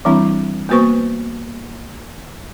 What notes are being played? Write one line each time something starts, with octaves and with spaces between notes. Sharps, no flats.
E3 G3 C4 D4 E4
A#3 B3 F#4 B4 C5 C#6